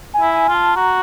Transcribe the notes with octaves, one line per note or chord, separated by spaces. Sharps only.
G#5
E4
G#5
F4
A5
F#4 A#5